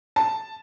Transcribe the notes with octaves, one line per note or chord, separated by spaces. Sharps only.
A5